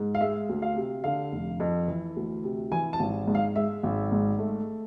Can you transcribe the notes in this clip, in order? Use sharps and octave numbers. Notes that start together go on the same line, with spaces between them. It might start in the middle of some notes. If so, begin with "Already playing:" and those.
Already playing: G#2
F5
G#3 E5
D2
F5
C3
D3 F5
F1
F2
E3
D2
C3
E3 G#5
A5
G#1
G#2
F5
G#3 E5
G#1
G#2
A3